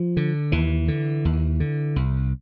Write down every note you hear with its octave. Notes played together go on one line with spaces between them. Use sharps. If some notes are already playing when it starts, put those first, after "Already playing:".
Already playing: F3
D3
D#2 E3
D3
D#2
D3
C2